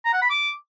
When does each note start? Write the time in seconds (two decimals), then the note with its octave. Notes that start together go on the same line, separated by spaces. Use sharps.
0.05 A#5
0.13 F#5
0.22 B5
0.30 D6